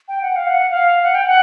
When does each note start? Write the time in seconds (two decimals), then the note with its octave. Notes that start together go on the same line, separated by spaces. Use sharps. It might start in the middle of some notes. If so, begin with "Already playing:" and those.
0.08 G5
0.22 F#5
0.36 F5
0.50 F#5
0.71 F5
1.03 F#5
1.15 G5
1.28 F#5